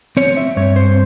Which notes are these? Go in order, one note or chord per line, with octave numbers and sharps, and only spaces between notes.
C4 C#5
E5
G2 C#5
C5